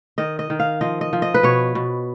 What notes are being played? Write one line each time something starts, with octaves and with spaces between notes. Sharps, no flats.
D#3 D#5
D#5
D#3
F5
F3 D#5
D#5
F3
D#5
B4
B2 C#5
B2